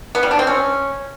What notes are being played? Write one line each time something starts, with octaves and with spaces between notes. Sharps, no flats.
B3
G3
D4
C4
C#4